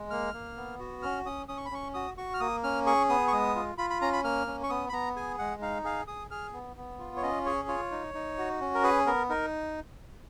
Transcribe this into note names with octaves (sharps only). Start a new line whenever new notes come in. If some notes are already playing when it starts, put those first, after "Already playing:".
Already playing: G#3
A#3 F6
A#3
B3
F#4
C#4 F6
C#4 D#6
C#4 D#6
C#6
B5
C#4 C#6
F#4 D#6
F#4 C#6
F6
A#3 D#6
C#4 F6
G#4 C#6
B3 D#6
C#6
G#3 D#6
F4
F4 B5
B5
C#4 A#5
B5
A#3 F6
C#4
C#6
B3 D#6
B5
B3 A#5
G#4 G#5
G#3 F#5
D#4 F5
G#4 F5
G#4 D#6
G#4 F6
B3
B3
F4
C#5
C#4 D#5
G#4 C#5
F4 C#5
D#4
D#4
F#4
C#4
A#4
G#4 B4
B3 A#4
D#4 A#4